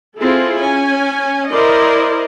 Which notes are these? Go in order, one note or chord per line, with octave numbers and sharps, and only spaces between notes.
C4 E4 F4 G#4 A4
C#4 G#5
E4 A#4 C5 D5 D#5